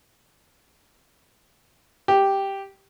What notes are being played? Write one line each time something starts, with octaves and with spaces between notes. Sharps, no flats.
G4